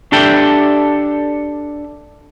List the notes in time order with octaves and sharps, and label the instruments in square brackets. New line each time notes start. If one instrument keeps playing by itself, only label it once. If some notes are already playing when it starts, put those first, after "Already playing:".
[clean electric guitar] D4 G4 A4 E5 G5